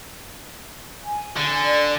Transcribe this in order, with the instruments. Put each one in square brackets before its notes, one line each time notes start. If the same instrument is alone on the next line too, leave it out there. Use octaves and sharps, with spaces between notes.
[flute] G#5
[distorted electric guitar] D3
[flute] D5